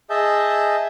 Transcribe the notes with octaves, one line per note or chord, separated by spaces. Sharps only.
G#4 D#5 E5 A5 G6